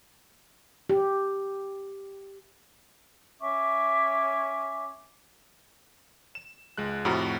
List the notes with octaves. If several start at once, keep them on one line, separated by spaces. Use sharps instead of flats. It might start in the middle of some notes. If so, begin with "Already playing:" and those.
G4
C#4 E5 C#6 D6
E7
C#2 G#3 F#6
F2 A2 C3 A3 F#4 A#5